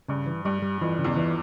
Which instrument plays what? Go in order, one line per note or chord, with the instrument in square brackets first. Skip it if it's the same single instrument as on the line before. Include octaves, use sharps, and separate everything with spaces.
[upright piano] G2 [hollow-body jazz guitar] C#3
[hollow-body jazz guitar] E3
[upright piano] G2 [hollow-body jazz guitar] G3
[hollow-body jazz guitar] G3
[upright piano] F2 [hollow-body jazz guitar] E3
[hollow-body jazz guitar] C#3
[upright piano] E2
[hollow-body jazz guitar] E3